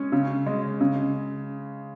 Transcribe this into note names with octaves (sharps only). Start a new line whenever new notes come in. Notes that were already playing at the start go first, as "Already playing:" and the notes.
Already playing: G#3 C#4
C#3
G#3
C#3